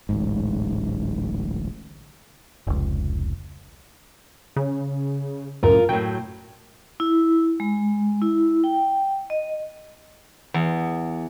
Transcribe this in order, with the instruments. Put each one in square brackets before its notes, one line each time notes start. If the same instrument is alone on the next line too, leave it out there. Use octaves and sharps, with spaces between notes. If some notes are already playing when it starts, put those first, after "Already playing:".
[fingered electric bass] D1 A1 G#2
[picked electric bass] F1 C#2
[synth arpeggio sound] C#3
[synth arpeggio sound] C#2 F#2 A2 [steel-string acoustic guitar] F4 A#4
[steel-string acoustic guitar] A2 F#3 [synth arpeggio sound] G5
[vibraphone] E4
G#3
E4
G5
D#5
[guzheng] E2